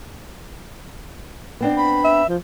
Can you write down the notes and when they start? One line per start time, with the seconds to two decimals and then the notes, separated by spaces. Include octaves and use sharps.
1.61 B3 C4 D4
1.77 B5
2.04 E5
2.29 F3